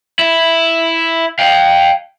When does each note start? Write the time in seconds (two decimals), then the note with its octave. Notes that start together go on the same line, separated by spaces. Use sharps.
0.19 E4
1.39 F5 G5